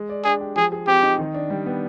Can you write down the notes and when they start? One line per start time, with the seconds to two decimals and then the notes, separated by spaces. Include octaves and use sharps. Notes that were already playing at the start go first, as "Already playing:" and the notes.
Already playing: G#3
0.09 D5
0.25 D4 G#4
0.41 G4
0.56 F3 G#4
0.72 G#4
0.87 C4 G4
1.03 D#4
1.19 D#3
1.34 D4
1.50 G3
1.66 B3